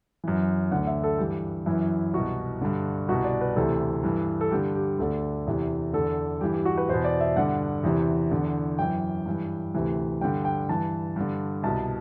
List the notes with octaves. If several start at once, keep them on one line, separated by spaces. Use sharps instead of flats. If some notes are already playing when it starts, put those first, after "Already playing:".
F#2 E3
D2 D3 F#5
E5
A4
G2 E3 G4
F#2 E3 E4
C2 B2 F#4
G2 D3
C2 B2 F#4
D5
B4
D2 C3 E3 A4
G2 E3
A4
G2 D3 G4
G4
D2 D3 A4
E2 C3 E3
E2 D3 A4
G2 E3 G4
G4
F#4
B4
E2 B2 C5
D5
E5
G2 D3 F#5
E2 C3 E3
E2 D3
F#2 E3 G5
G2 E3
D2 C3 E3
G2 D3 G5
G5
G2 E3 A5
G2 D3
C2 B2 A5